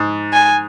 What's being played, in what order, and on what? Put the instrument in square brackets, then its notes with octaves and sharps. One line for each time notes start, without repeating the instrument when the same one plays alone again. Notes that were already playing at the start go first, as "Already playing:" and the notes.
Already playing: [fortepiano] G#2
[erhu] G#5